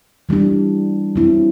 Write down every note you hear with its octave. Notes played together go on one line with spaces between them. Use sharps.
E3 G3 D4
F#3 C4 E4